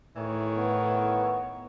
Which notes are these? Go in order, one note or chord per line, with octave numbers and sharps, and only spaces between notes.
A2 D#3 E3 C#5
B3